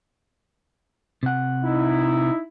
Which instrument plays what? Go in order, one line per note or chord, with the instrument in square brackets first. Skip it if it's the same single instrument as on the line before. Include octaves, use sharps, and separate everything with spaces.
[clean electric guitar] C3 F#5
[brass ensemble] D#4 E4